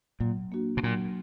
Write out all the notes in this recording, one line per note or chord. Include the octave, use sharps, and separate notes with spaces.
A#2 F#3
A#3 D4 F#4
B2
A#2 F#3